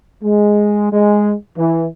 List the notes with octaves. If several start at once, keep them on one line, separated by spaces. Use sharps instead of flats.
G#3
G#3
E3